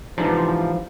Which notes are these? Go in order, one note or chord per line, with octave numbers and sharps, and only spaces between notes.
G#2 C3 E3 F3 D4